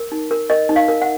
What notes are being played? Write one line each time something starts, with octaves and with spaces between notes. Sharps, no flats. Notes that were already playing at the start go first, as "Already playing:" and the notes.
Already playing: A#4
D#4
A#4
A#4 D#5
D#4
F5
A#4
F#5